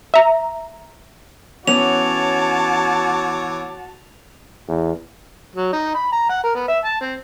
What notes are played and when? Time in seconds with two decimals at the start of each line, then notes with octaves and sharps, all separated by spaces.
0.14 E5 A#5
1.68 E3 B3 C#4 F#4 C#5 A5 D6 F7
4.68 E2
5.55 F#3
5.73 D#4
5.95 B5
6.12 A#5
6.29 F#5
6.43 A#4
6.55 B3
6.68 E5
6.84 A5
7.00 C4